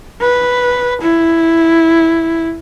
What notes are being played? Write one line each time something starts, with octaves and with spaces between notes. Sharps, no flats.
B4
E4